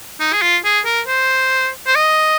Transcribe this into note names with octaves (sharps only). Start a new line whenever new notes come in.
D#4
G#4
F4
G#4
A#4
C5
C5
D#5